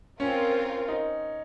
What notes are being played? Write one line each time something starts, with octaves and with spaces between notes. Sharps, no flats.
C4 C#4 F4 A#4
D#4